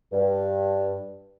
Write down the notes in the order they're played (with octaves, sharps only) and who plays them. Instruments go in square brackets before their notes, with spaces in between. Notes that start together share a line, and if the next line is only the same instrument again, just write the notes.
[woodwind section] G2